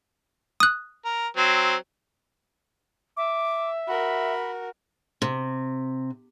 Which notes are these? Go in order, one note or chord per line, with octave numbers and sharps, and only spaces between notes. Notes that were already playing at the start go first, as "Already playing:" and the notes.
D#6 F#6
A#4
F#3 C4
E5 D6
F#4 A#4 B5
C3